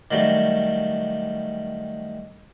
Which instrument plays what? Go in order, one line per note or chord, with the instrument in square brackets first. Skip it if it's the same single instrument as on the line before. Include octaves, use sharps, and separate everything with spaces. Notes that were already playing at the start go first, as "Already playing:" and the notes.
[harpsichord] D#3 F#3 G3 A3